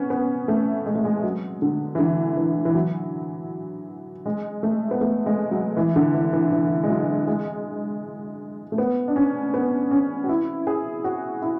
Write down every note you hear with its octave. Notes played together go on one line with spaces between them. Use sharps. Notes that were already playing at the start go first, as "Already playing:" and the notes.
Already playing: B3 C#4
B3
A3
G#3
A3
G#3
F#3
D3
E3
D3
E3
E3
F#3
G#3
A3
B3
A3
G#3
F#3
E3
D3
E3
E3
E3
G#3
F#3
G#3
A3
B3
D4
C#4
B3
C#4
F#4
E4
G#4
F#4
E4